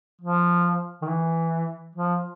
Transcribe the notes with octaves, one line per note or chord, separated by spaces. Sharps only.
F3
D#3
E3
F3